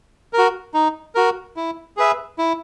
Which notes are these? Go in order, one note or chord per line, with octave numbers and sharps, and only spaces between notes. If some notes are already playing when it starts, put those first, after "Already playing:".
F#4 A#4
D#4
F#4 A#4
E4
G#4 B4 E5
E4